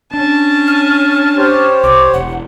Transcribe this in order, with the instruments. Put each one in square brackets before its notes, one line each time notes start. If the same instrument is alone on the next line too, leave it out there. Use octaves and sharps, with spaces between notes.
[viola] C#4 A5 [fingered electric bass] D4
[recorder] F6
[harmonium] G4 C5 C#5
[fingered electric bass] C2 [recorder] D6
[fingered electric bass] E1 [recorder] F#5